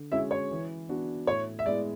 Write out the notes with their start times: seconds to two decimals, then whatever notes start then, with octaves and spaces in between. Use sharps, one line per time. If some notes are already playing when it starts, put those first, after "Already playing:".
Already playing: D3
0.12 G#3 C#4 E4 F#4 E5
0.31 C#5
0.51 E3
0.89 B3 D4 F#4
1.27 A2 C#5
1.59 E5
1.66 G#3 B3 E4 D5